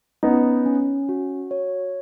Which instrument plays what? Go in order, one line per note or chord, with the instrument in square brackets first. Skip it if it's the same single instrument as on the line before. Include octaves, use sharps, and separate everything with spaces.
[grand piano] B3 D#4 [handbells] C#4
[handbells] C#4
F#4
C#5